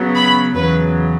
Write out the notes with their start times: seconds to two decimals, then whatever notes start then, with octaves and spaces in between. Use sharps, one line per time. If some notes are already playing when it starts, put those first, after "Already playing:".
Already playing: C#3 F#3 B3
0.15 B5
0.54 E2 C#3 F#3 B4